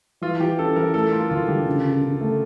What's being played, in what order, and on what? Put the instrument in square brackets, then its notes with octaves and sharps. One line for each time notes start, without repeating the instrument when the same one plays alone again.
[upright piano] E3 [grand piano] F4
[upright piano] E3 [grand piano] G4
[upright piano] C#4 [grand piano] A4
[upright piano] E3 [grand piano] A#4
[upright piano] A3 [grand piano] A4
[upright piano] A3 [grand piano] F4
[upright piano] D2 [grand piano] F4
[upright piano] D3 [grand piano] G4
[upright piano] C#3
C#3
C#3
A3